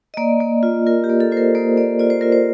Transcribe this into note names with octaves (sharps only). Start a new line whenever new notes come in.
D#5
A#3 D5
A#3
F4
F4 A#4
G4
A#3
A4
F4 C5
A#4
A#3 C5
A#3 D5
F4 D5
C5
F4 A#4
C5